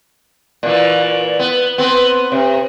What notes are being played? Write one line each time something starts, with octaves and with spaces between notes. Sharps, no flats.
A#2 E3
B3
B3 C4
C3